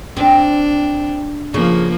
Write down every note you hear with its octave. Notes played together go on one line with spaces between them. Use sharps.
C4 D4
C#3 F3 A#3